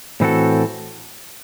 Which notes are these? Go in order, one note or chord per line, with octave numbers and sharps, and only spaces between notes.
A2 E3 C4 F#4 A4